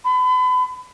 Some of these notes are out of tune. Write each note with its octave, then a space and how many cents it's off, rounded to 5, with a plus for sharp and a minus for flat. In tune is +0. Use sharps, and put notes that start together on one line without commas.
B5 +35